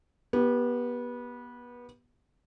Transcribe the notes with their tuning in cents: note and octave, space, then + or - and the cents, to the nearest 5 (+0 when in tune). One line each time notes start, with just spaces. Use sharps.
B3 -25 G4 +0